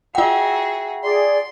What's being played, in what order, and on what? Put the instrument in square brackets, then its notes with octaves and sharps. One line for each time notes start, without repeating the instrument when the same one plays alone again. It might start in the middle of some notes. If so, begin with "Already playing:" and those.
[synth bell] F4 F#5 [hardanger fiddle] F#4 G#4 [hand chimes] E5 G5
[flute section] G#4 D5 [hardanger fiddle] C6